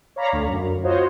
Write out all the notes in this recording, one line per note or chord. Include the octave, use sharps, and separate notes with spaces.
C#5 D5 F5 A#5 B5
D2
F#2
F4 F#4 C5 C#5 D#5